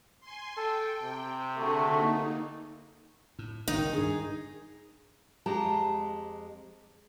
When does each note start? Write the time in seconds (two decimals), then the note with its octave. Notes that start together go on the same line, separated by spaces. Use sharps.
0.20 G#5 C6
0.57 A4 G5
1.03 C3
1.58 D3 A3 F#4 G#4 A4
1.94 A#3 D#4
3.39 A2
3.68 G#1 C#2 G2 D#3 D#4
3.93 G2 D4 G#4
5.46 F2 G#3 G4 A5 A#5